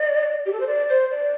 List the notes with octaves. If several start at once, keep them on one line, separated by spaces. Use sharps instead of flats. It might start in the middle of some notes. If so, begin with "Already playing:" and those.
Already playing: D5
G4
A4
C5
D5
C5
D5